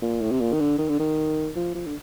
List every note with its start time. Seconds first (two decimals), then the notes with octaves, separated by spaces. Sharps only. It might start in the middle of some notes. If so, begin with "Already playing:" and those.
0.02 A#2
0.22 A2
0.31 C3
0.41 A#2
0.53 D#3
0.60 D3
0.79 D#3
0.89 D3
1.00 D#3
1.56 F3
1.75 F3
1.86 D3